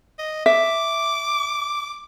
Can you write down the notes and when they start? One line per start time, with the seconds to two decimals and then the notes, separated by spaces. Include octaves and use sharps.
0.19 D#5
0.46 E5 D6